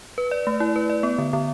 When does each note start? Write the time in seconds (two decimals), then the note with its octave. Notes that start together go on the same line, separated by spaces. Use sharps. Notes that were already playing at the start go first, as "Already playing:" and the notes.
0.18 B4
0.31 D5
0.47 A3
0.60 E4
0.76 B4
0.90 D5
1.03 B3
1.18 D3
1.33 D3